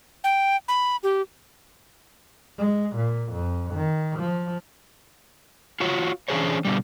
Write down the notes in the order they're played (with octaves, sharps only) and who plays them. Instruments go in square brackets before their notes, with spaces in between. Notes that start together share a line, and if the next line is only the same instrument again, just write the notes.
[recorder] G5
B5
G4
[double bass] G#3
A#2
F2
D#3
F3
[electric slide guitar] F4 F#4 C#5
E3 C#4 D4 G#4 C5 C#5
B2 D3 G3